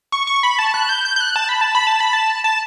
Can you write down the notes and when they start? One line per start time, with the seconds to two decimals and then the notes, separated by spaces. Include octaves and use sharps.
0.12 C#6
0.27 C#6
0.43 B5
0.59 A5
0.74 F#6
0.89 G6
1.05 G6
1.16 G6
1.21 F#6
1.36 A5
1.49 B5
1.61 A5
1.75 B5
1.87 A5
2.00 B5
2.13 A5
2.44 A5